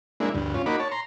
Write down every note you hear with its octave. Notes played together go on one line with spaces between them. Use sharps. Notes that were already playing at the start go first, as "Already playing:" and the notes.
G#3 A#3 D4 E4
D2 G2
C#4 F4
A#3 D#4 F#4 B5 D6
C#5 A5
A#5 C6